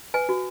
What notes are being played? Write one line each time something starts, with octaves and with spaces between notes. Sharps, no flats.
B4 G#5
F#4